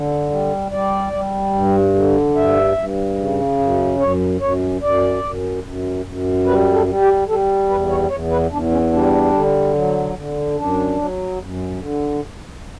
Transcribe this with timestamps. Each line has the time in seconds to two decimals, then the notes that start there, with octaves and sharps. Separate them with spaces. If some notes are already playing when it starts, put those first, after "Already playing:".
Already playing: D3
0.30 G3
0.71 G3 D5
1.13 G3
1.54 G2
1.95 D3
2.36 G2 E5
2.77 G2
3.18 C#3
3.59 F#2
3.99 F#2 C#5
4.41 F#2 C#5
4.81 F#2 D5
5.23 F#2
5.64 F#2
6.05 F#2
6.46 G3 B4
6.73 A4
6.87 G3
7.01 G4
7.28 G3 A4
7.70 E2 B4
7.90 C#5
8.10 E2 C#5
8.31 B4
8.51 E2 D4
8.72 C#4
8.93 G3 D4
9.33 D3
9.74 F#3
10.16 D3
10.57 F#2 D4
10.98 F#3
11.39 F#2
11.80 D3